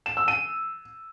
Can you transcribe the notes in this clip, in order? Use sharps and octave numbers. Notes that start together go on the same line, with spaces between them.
E7
E6
D#7